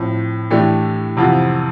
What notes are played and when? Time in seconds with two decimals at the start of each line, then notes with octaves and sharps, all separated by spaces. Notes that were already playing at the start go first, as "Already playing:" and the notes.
Already playing: A2 F3 C4
0.50 A2 E3 A3 D4 G4
1.17 F2 C3 E3 B3 F4